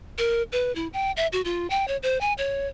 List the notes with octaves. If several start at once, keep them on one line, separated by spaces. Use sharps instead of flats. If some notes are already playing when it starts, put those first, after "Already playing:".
A#4
B4
E4
G5
E5
F#4
F4
G5
C#5
C5
G#5
C#5